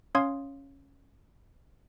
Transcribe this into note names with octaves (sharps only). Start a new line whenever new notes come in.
C#4 C#5 F5 C6 D#6 G#6